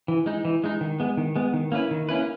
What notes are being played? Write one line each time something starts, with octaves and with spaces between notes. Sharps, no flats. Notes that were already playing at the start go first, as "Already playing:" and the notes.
E3
G#3 D#4
E3
G#3 D#4
D#3
G#3 B3
D#3
G#3 B3
D#3
A#3 C#4 E4 B4
D#3
A#3 C#4 E4 B4